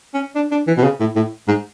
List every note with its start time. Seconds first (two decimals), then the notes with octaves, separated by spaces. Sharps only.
0.14 C#4
0.35 D4
0.51 D4
0.67 E3
0.77 B2
0.84 C#3
1.00 A2
1.16 A2
1.48 G#2